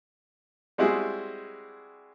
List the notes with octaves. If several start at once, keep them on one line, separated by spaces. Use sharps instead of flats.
G3 G#3 C4 E4 F#4 G#4